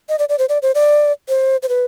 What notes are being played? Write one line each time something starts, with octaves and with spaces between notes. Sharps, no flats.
D#5
D5
D5
C5
D5
C5
D5
C5
C5
B4